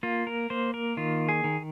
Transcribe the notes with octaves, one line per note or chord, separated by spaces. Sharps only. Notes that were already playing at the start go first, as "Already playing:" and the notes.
A#3 F4
A#4
A#3 C5
A#4
D#3 F4
G#4
D#3